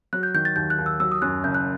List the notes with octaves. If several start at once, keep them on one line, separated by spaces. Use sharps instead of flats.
F#3 F#6
G6
D#3 G6
A6
D#2 G6
F#6
D#2
E6
F#3 E6
D#6
F#2 F#6
F#1 G6
F#6